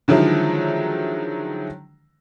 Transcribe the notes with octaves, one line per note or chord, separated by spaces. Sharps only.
D3 D#3 F3 F#3 G#3 E4